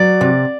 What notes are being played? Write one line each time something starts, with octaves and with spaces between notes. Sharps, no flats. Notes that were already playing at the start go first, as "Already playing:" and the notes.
Already playing: F#3 D5
C3